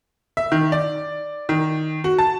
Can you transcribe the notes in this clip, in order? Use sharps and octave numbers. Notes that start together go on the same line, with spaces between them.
E5
D#3
D5
D#3
F#4
A5